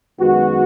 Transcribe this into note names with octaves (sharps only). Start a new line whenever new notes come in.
F#2 D#3 G#3 B3 F#4